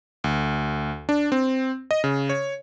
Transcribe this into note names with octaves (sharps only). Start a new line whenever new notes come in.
D2
D4
C4
D#5
C#3
C#5